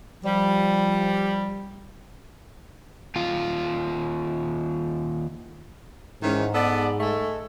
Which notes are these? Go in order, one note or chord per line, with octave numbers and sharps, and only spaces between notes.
F3 G3
D#2 F4
G#2 D#3 E3 C#4
B3 A4 D5
G#3 A3 A4